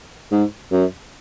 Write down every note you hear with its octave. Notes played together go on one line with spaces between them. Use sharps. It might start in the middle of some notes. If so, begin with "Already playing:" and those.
G#2
F#2